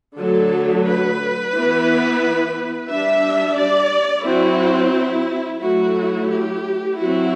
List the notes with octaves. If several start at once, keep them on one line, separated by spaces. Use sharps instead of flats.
D3 F#3 A3 A4
B4
E3 B3 E4
G3 D4 E5
D5
F#3 C4 E4 F#4
E4
F#3 A3 E4 F#4
G4
F#3 C4 E4 F#4